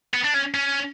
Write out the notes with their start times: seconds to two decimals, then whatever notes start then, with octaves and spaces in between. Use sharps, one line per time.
0.14 B3
0.24 D4
0.34 C#4
0.54 C#4